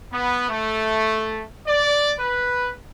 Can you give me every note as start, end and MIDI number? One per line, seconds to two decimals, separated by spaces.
0.12 0.48 59
0.50 1.43 57
1.67 2.12 74
2.19 2.70 71